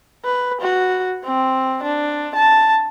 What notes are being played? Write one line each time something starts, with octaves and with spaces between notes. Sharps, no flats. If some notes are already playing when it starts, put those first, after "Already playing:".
B4
F#4
C4
D4
A5